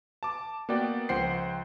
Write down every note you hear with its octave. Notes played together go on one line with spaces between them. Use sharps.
A5 D6
A#3 B3 F#4 D5 G5
C#2 F3 C5 F#5 G5 C7